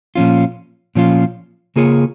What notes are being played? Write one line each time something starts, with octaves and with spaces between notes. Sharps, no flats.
A#2 F3 C#4 F4
A#2 F3 C#4 F4
C#3 A#3 F4 G#4 C#5